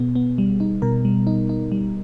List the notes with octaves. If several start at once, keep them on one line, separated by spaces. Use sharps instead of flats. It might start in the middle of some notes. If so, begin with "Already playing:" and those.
Already playing: B2 B3 G#4
B3
G3
D#4
B2 A#4
G3
D#4
D#4
G3